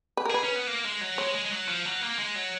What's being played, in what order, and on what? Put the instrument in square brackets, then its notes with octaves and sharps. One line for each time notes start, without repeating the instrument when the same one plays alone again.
[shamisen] B4
A#4
[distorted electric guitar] G#4 [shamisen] B4
[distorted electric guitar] C#4
B3
A#3
G#3
F#3
[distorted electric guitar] G#3 [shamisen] C#5
[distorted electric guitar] G#3
G#3
F#3
F3
F#3
A#3
G#3
F#3